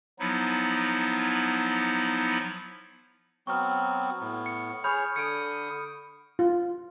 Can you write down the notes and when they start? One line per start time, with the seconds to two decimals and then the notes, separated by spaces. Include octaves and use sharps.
0.19 F3 F#3 B3 D#4 E4
3.47 F#3 B3 C4 C#6 F6
4.21 A2 B3
4.46 C#7
4.84 G#4 C#5 B5 F6 G6
5.16 D3 D#6 C#7 D7
6.39 F4